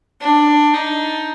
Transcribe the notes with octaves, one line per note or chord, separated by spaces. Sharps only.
D4
D#4